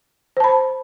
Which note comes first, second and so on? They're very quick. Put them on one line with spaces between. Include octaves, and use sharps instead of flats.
C5 A5 B5